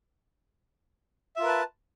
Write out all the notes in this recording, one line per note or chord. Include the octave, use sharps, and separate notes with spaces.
F4 A#4 B4 E5 A5